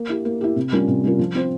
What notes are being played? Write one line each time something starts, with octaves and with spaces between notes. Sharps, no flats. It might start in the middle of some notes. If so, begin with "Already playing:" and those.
Already playing: A#3
E4 G4
A#3
E4 G4
C3
G3 C#4 F4 A#4
C3
G3 C#4 F4 A#4
F3
C4 F4 C5